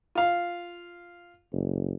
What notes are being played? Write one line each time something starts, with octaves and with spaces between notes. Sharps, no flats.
F4 F5
F#1